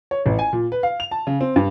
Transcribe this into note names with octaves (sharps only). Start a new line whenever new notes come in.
C#5
A1
G#5
A#2
B4
F5
F7
A5
C#3
C4
G2